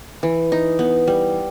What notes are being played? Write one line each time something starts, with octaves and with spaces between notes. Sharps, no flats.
E3
D#4
B3
G3